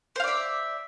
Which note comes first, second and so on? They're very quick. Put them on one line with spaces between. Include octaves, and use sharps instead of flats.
C5 F5 D5 E5